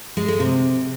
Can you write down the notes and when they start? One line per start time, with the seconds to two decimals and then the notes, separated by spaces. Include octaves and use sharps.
0.17 G#3
0.28 G#3
0.40 C3